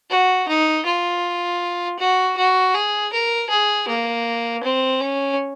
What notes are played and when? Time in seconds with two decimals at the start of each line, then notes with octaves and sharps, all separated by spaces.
0.10 F#4
0.48 D#4
0.86 F4
1.99 F#4
2.37 F#4
2.74 G#4
3.13 A#4
3.50 G#4
3.88 A#3
4.64 C4
5.01 C#4